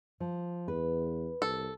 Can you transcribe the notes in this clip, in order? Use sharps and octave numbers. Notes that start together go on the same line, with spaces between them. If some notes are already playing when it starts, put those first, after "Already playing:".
F3
E2 B4
C2 A4